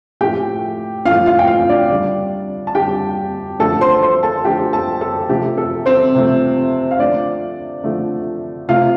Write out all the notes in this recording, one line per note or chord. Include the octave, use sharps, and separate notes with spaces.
A2 F3 A3 G4 G5
A2 F3 A3 F4 F5
F4 F5
G5
F4 F5
D4 D5
D3 G3 D4 D5
A5
D3 G3 G4 G5
D3 F3 A3 A4 A5
C5 C6
C5 C6
A4 A5
D3 F3 A3 G4 G5
A4 A5
A4 A5
C3 F3 A3 G4
A4
C4 C5
C3 F3 A3
F5
D3 F3 A3 D4 D5
D3 F3 A3
C3 A3 F4 F5